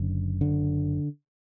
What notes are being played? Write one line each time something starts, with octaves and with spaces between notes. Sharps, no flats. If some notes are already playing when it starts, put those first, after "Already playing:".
Already playing: F#1 F#2 D3
D3